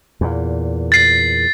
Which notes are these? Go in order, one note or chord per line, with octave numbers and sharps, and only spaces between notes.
E2 A#2
A6 C7